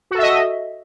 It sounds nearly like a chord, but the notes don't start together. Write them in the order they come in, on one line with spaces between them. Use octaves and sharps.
F#4 A4 E5 D#5